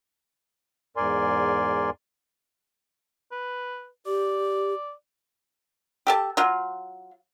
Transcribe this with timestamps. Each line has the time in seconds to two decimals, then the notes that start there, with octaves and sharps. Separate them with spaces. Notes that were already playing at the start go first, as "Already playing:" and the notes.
0.97 E2 G#2 A#4 D5 G#5 C6
3.32 B4
4.06 G4 D5
6.07 G4 A4 A5
6.37 F#3 F4